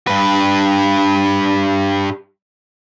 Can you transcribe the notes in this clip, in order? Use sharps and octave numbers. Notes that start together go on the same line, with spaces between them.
G2 B4